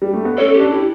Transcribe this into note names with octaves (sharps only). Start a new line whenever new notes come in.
G3
A3
B3
C#4 A4
G4
D4
E4 G4